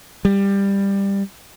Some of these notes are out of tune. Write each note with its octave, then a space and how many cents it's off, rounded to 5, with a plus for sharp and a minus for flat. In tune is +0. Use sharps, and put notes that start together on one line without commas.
G3 +15